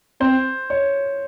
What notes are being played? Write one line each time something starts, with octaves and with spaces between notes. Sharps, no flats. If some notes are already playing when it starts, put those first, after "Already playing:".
C4 C5
C#5